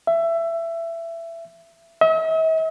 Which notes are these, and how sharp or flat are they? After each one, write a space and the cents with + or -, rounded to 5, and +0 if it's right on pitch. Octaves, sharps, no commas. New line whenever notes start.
E5 +20
E5 -45